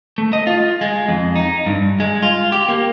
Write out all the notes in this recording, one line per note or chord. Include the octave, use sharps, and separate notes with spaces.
A3
D#5
F4
G#3
F2
D#4
G2
G#3
F4
G4
A#3